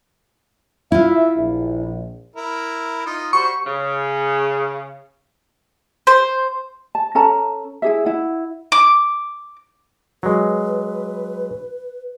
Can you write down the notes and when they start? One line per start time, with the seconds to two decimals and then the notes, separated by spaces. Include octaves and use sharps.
0.92 E4 F4 E5
1.37 A#1
2.36 E4 A#4
3.06 D#4 F4
3.33 G3 F#4 C5 C#6
3.67 C#3
6.07 C5
6.95 A5
7.15 C#4 A4 A5 A#5
7.82 E4 G#4 E5
8.05 E4 F#5
8.72 D6
10.23 F#3 G#3 B4